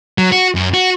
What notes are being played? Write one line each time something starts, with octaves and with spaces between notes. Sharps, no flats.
F#3
F#4
F#2
F#4